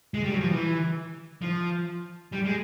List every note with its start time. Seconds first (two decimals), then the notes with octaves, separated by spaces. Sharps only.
0.14 G#3
0.24 G3
0.32 F#3
0.40 F3
0.50 E3
1.42 F3
2.32 G3
2.45 G#3